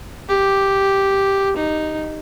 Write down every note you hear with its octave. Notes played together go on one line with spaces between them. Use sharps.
G4
D#4